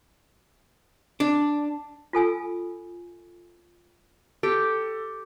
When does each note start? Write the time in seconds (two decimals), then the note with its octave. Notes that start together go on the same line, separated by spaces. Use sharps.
1.20 D4
2.13 F4 A4 G#5 E6
4.43 G4 A4